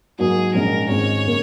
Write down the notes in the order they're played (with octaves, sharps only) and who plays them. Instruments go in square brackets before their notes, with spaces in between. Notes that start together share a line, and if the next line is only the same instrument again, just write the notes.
[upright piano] G#2 F#3 A#3 [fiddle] G#4
[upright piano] A#1 G#2 G#3 C#4 [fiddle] A#4
[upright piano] G#1 G#2 G#3 C#4 [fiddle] C#5
[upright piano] C#3 A#3